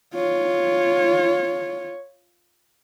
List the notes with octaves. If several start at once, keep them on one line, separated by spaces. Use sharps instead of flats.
F4 C#5